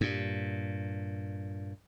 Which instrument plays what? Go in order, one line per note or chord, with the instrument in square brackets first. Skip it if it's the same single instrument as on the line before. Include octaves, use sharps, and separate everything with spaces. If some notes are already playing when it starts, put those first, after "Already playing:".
[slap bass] G2 A#2